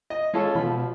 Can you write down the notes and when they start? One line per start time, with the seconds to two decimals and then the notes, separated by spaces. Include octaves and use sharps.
0.10 D#5
0.34 G#3 C#4 F4 A4
0.55 B2 F3 B5